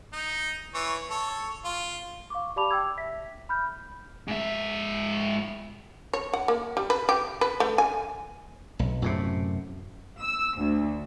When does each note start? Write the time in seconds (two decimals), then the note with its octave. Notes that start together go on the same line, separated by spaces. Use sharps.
0.13 D#4
0.74 E3 C#5
1.10 A4 C#5
1.65 F4
2.30 F5 C#6 D6
2.56 G4 D5 A5 B5 D6 F7
2.71 G5 D6 E6 G#6
2.98 E5 B6
3.49 B5 F6 G6
4.28 G#2 E5
6.13 C#5
6.33 F#5
6.48 A#3
6.77 G3
6.90 B4
7.09 G4
7.41 B4
7.60 A3
7.78 G#5
8.79 B1
9.02 F#2 A2 C3
10.21 E6
10.58 D2